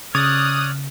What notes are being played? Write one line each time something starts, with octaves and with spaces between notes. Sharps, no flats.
C#3 C#5 D5 D#6 F6 F#6